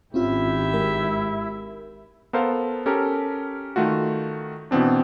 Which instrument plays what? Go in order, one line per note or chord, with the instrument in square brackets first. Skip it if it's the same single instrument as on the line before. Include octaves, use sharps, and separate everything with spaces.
[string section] G#1 [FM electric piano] C4 C#4 F4 [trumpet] E4 [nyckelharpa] G4 E5
[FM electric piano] G#3 A#4
[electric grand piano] B3 A4 A#4 C5 F5
C#4 G4 A4 A#4
D#3 A3 F4 F#4
B2 E3 B3 C4 D4